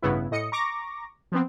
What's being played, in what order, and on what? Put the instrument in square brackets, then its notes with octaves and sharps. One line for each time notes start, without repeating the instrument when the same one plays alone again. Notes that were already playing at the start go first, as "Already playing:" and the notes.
[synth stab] A1 G2 C#3 B3 E4
A2 D#5 C#7
A#5 C#6 D6 A#6
F3 B3 C4